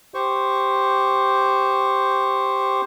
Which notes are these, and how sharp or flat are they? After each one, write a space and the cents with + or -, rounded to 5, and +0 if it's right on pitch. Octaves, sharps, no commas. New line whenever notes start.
G4 +0 C5 +0 C#6 +0